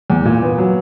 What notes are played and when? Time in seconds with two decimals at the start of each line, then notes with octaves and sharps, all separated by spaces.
0.10 E2
0.25 A#2
0.43 B3
0.58 F#3